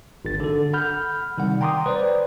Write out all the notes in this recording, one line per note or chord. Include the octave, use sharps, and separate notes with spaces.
G#1 A6
D3 A4
F#5 B5 F6 G6
C3 D#3 G3 F#5
G5 A#5 C6 D6 D#6
B4 C5 D5